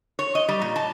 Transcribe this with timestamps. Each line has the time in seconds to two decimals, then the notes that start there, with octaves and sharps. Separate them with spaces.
0.19 C#5
0.35 D#5
0.48 G3
0.61 A#2
0.76 A5